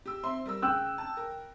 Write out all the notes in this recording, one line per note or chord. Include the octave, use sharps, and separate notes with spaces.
G4 E6
C4 E5 C6
G3 A#4 E6
C#3 G5 E6 F#6
A5
A#4